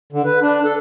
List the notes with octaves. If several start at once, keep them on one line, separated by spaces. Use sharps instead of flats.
D3
B4
D4
A4